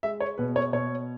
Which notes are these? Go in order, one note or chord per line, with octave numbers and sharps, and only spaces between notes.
G#3 E5
C#5
B2 B4
C#5
B2 C#5